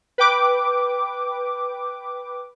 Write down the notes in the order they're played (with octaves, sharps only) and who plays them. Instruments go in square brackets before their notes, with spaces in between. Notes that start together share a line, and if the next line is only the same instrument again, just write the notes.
[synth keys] B4 G5 D6